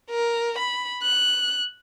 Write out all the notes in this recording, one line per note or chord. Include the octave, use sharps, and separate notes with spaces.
A#4
B5
F#6